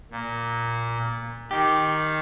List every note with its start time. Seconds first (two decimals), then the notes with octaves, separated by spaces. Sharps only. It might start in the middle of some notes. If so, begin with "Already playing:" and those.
0.11 A#2
1.51 D#3 G4